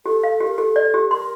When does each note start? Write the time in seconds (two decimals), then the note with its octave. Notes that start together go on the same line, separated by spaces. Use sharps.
0.06 G4 A4
0.24 F5
0.41 G4
0.47 A#4
0.58 G4 A4
0.76 D5
0.94 G4
1.11 A#4 C6